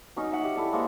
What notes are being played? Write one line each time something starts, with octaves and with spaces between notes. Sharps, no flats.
F#3 C#4 D#4
E5 F#5
G4
E4 A4 D5
G#3 A#3 C5 C#6